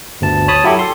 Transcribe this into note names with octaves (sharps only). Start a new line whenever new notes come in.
G1 D2 A5
C#5 A5 B5 D#6
F#3 E4 G4 A4
A4 C6